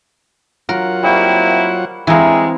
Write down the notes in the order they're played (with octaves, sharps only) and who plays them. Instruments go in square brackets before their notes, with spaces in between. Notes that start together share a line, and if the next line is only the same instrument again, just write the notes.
[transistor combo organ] F#3 F4 F#5 [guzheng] A#4
[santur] G3 F5 C#6 [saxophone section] A#3 C4 E4
[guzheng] E3 C4 [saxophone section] G3 G#3 [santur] E4 A#4 F5